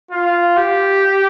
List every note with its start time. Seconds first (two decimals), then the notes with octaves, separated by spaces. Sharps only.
0.11 F4
0.57 G4